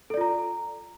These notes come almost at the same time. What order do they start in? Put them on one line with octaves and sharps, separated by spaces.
A4 D5 F4 A#5